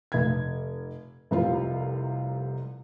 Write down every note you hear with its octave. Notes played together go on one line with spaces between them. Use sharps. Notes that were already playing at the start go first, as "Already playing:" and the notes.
F1 G#6
F1 C2 C3 F4